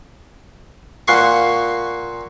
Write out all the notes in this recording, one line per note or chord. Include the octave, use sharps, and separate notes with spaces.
A#2 F5 F#5 C6 C#6